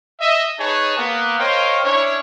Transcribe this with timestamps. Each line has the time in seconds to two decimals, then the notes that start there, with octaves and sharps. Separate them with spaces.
0.19 D#5 E5
0.59 D#4 G#4 B4 C#5 G#5 A5
0.97 A#3 B3
1.39 A#4 C5 C#5 D#5 F5 G5
1.83 C#4 D4 E4 C#5